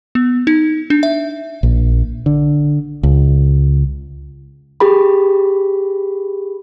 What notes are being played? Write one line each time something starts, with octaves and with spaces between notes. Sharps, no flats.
B3
D#4
D4
E5
A#1
D3
C#2
G4 G#4 B5